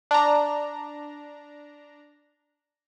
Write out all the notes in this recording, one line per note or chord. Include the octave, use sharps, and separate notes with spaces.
D4 A#5